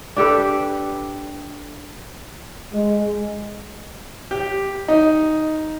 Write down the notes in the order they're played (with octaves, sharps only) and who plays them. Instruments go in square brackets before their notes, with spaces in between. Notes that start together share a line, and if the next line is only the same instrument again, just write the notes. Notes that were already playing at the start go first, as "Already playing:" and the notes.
[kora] D4 G4 A4 B4
[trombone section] G#3
[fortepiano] G4
D#4